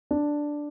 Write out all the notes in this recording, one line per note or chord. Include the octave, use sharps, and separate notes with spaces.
D4